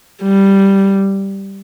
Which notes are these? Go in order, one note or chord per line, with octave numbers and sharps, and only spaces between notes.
G3